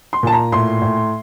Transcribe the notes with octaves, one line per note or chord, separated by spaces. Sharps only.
C6
A#2 A5
A#5
A2 C6
A2